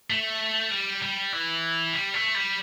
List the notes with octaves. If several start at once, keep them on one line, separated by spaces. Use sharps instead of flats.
A3
G3
G3
E3
G3
A3
G3